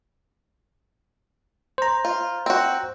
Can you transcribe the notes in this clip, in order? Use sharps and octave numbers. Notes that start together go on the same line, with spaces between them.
C5 A#5
F4
C4 F#4